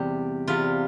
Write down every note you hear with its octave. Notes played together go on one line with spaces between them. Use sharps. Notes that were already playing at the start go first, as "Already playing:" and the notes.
Already playing: E2 C3 G3 G4
E2 C3 G3 F4